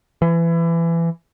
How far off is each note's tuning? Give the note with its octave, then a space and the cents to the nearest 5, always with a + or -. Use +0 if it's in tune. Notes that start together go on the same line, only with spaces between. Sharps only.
E3 +25